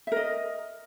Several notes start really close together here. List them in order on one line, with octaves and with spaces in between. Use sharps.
E5 A#4 D#5